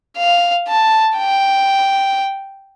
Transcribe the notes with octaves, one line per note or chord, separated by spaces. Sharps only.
F5
A5
G5